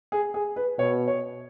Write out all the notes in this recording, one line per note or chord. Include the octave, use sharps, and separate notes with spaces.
G#4
G#4
B4
B2 C#5
C#5